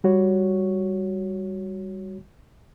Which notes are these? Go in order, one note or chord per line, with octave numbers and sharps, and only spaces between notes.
G3 F#4 C#5